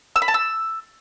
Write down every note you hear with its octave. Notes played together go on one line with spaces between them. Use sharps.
E6
B5
A5
E6